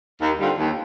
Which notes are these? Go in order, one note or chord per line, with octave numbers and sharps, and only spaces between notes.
D#2
D3 G3 C4 F4
D#2